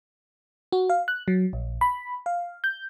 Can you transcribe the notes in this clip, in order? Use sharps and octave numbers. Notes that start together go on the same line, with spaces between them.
F#4
F5
F#6
F#3
A#1
B5
F5
G6